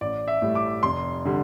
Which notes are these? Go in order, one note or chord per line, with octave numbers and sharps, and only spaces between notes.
A1 D5
E5
A2 G3
D6
F1 C6
D3 G3